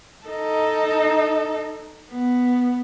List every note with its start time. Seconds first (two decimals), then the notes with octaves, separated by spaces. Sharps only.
0.26 D#4 A4
2.11 B3